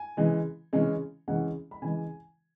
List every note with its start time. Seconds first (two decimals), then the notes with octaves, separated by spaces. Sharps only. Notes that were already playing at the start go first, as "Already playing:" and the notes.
Already playing: G#5
0.17 C#3 E3 G#3
0.73 C#3 E3 G#3 C#4
1.28 C#3 E3 G#3 C#4 F#5
1.71 B5
1.82 C#3 E3 G#3 G#5